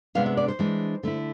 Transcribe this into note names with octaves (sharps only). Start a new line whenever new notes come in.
C3 G#3 B3 D4 F5
E5
D5
C5
E3 G#3 D4
D3 A3 E4